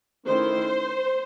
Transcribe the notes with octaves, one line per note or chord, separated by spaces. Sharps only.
D#3 A3 C#4 E4 C5